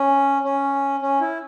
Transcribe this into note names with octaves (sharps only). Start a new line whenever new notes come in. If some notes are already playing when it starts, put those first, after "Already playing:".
Already playing: C#4
C#4
C#4
E4